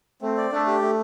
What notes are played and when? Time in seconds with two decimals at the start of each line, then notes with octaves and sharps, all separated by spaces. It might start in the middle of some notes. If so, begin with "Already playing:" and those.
0.22 A3 C4
0.37 D5
0.52 A3 D4
0.67 G4
0.82 A3